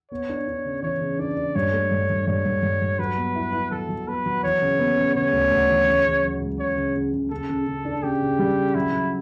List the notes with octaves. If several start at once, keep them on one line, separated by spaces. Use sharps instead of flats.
B3 C#5
D4
D4
C#3
E3 C#5
C#3
D4 D5
D4
G2 C#5
A3
G2
G2
G2 C#5
G2
G2
G2
F#3 B4
B3
E4
E4
F#3 A4
F#3
B3 B4
F#3
E3 C#5
C#3
B3
C#3
C#3 C#5
D2
D2
E3
C#3
C#3
F#3
C#2
C#3 C#5
C#3
C#3
C#3
C#3 A4
C#3
C#3
D4
C#3 G4
C#3
G3
C#3
F#3 E4
F#3